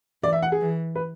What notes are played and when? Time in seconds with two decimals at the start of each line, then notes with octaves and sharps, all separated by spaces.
0.23 E3 D5
0.33 E5
0.42 F#5
0.52 G#4
0.61 E3
0.95 B4